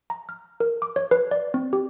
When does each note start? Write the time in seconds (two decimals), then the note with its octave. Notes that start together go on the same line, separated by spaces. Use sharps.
0.10 A#5
0.29 F6
0.60 A#4
0.82 D6
0.96 C#5
1.11 B4
1.31 D5
1.54 C4
1.73 G4